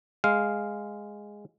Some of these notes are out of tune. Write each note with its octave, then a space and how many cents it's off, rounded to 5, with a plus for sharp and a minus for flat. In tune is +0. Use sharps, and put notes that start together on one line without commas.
G#3 -5 F5 +0